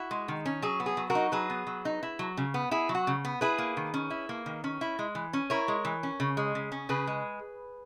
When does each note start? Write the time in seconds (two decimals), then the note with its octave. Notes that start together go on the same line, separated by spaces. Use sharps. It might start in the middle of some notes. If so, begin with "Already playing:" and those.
Already playing: E4 F#4
0.11 G#3
0.28 D#3
0.46 C#4
0.62 F#3 G#4
0.80 B3
0.86 G#4
0.97 F#3
1.10 F#4 A#4
1.15 D#4
1.32 F#3 G#4 B4
1.50 B3
1.67 F#3
1.85 D#4
2.03 E4
2.19 F#3
2.37 C#3
2.54 B3
2.71 E4 G#4
2.89 F#3
2.95 F#4
3.07 C#3
3.25 B3
3.41 E4 G#4 B4
3.58 A#3
3.77 D#3
3.94 C#4
4.10 E4
4.29 A#3
4.46 D#3
4.64 C#4
4.81 E4
4.99 G#3
5.15 E3
5.33 C#4
5.50 E4 A#4 C#5
5.68 G#3
5.85 E3
6.03 C#4
6.20 C#3
6.37 G#3
6.55 C#3
6.72 C#4
6.89 C#3 G#4 B4
7.07 G#3